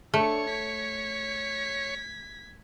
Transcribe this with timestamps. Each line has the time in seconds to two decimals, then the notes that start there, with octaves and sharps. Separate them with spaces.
0.14 A3 D4 A4 C#5
0.50 G#6 B6